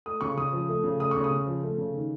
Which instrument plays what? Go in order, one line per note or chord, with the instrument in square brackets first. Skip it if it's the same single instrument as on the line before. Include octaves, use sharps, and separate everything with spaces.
[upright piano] A3 D#6
C#3 C#6
C#3 D#6
F3
A3
C#3
A3 D#6
C#3 C#6
D#6
C#3
F3
A3
C#3
D#3